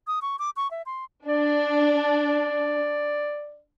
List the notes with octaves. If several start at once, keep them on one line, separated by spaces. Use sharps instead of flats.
D#6
C#6
D6
C#6
E5
C6
D4 D5